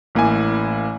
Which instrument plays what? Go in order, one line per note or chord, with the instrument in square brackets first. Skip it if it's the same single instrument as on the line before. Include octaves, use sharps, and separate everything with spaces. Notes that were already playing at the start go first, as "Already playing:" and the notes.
[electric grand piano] A1 A#3 E4 G#5